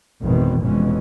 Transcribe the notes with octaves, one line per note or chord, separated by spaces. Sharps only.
G#1 F2 B2 D#3 E3
F1 F2 B2 E3 G#3 C#4